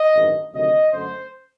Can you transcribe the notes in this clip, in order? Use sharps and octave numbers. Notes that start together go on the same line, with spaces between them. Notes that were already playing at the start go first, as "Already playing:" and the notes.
Already playing: D#5
A1 G2 D#3 F#3
D2 C3 D#3 F#3 D#5
F#2 D3 A3 C5